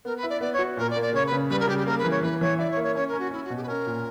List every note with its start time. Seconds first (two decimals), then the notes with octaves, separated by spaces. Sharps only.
0.05 B3 A#4
0.16 B4
0.23 E4
0.29 D5
0.41 B3 D5
0.53 C#5
0.59 F#4
0.77 A#2 A#4
0.90 D5
0.96 A#3
1.02 D5
1.13 C#3 C#5
1.26 B4
1.32 C#3
1.49 G3 B4
1.60 A#4
1.68 C#3 G4
1.78 G4
1.86 A#3 A#4
1.98 B4
2.04 E3
2.10 C#5
2.22 E3 B4
2.41 E3 C#5
2.59 E4 D5
2.71 C#5
2.76 A#3
2.83 C#5
2.95 C#4 C#5
3.08 A#4
3.13 C#4
3.19 F#4
3.31 C#4 E4
3.44 F#4
3.50 B2
3.56 G4
3.63 B4
3.68 C#4 A#4
3.87 A#2